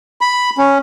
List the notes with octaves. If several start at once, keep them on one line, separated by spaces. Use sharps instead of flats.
B5
C#4